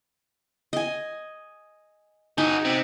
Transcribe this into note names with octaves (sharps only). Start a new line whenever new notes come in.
D#5 G#5
D#4 F#4 G#4
C3